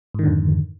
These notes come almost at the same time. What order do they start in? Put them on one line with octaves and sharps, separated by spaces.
G#2 D#3 D3 F2